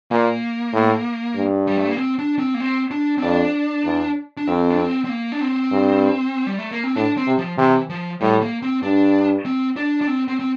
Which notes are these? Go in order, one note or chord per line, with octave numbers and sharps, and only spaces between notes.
A#2 A#3
A2
G2
G3
A3
A#3
C4
D4
C4
A#3
C4
D4
C4
F2 D4
E2
D4
F2 C4
D4
C4
C4
A#3
D4
C4
G2
G3
A3
A#3
C4
A2 D4
C4
C3
F3
C3 E3
F3
A2 G3
A#3
C4
G2 D4
C4
D4
D4
C4
C4
C4